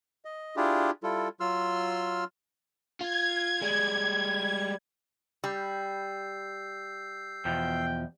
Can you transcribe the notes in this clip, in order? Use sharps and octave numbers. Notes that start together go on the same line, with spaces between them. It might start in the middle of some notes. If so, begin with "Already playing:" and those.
D#5
D4 E4 F4 G4 G#4
G3 E4 F4 A4
F#3 F4 C6 E6 F6
F4 G#6
G3 G#3
G3 E6 G6 C7
E2 B2 F3 G5